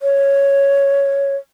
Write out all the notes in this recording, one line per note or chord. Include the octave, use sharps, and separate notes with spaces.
C#5